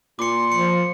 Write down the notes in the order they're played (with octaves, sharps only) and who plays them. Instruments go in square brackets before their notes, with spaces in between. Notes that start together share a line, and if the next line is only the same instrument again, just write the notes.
[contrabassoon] A#2 [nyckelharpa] C6 [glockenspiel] D6 C#7
[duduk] F3 [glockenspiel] C#7